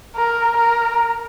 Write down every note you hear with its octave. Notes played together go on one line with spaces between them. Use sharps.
A#4
A#4